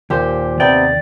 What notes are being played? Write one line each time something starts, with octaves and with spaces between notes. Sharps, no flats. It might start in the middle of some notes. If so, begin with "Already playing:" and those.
D#2 A#2 G4 C5
D#2 C3 B3 D5 G5